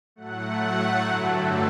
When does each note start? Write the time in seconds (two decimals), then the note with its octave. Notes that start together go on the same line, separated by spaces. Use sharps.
0.16 A2 F#3 A3 F#5
1.04 G2 D3 F#3 A3 A4